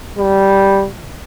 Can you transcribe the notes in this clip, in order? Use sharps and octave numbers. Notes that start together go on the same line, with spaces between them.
G3